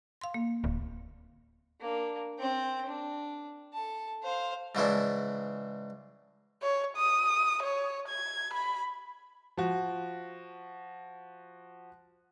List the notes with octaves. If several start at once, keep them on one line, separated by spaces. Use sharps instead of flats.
F5 C6
A#3
D1
A#3 D4
C4 G5
D4
A4 A5
C5 F5
G#2 C#3 E3 D4
C#5
D#6
C#5
G#6
B5
F3 F#4